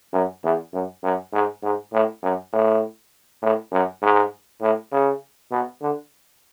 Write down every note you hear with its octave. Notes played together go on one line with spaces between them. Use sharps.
F#2
E2
F#2
F#2
G#2
G#2
A2
F#2
A2
A2
F#2
G#2
A2
C#3
B2
D3